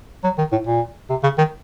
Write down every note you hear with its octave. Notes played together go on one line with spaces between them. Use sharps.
F#3
D#3
A2
A#2
C3
C#3
D#3